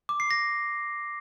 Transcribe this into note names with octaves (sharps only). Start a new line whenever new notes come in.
D6
C7
A#6